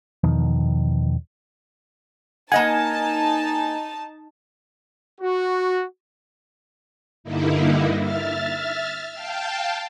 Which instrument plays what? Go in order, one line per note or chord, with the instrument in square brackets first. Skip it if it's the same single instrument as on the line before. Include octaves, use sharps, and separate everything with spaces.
[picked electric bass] E2 B2 D#3 F3
[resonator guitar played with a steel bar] A#3 D#5 F#5 [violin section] D#4 A5 [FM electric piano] G#5
[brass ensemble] F#4
[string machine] G2 D3 A#3 D#4 E4
E5 F6 A6
F5 G5 A5